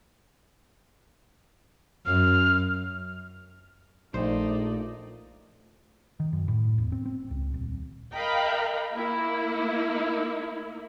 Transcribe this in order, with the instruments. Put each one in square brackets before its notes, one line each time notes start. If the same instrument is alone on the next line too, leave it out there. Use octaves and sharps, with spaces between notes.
[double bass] F#2 [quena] F6
[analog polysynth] A#1 [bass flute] A3 [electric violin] D#4 D5 [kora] C5
[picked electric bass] D#3
F#2
A2
E1
C4
C4
C#2
D#1
[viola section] A#4 D#5 F5 G5 A#5 B5
A#3 E4